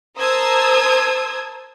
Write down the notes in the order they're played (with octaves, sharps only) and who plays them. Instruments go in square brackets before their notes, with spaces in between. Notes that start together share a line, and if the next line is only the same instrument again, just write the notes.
[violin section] A#4 C5 A5 D#6 E6 G#6